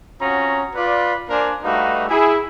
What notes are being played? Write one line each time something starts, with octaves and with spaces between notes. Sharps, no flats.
C4 C#4 F4 F#4 A#5 D#6
F4 B4 D5
A#3 D4 A#4 C5 D5 G#5
G3 A3 D#4 F#4 B4 F5
E4 G#4